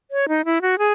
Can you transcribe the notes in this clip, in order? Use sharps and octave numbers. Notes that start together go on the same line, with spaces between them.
C#5
D#4
E4
F#4
G#4